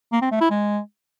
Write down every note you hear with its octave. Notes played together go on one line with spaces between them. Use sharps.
A#3
C4
A3
E4
G#3